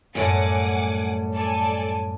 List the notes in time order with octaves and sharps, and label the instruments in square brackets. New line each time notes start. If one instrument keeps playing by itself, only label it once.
[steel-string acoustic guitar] F#2 A2 G3 [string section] F#5 G#5 D6
[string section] A4 D5 G#5